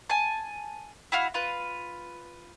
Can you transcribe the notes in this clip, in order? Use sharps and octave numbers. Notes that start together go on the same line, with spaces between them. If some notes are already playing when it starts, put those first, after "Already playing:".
G#5 A5
E4 F#4 F5
F4 B4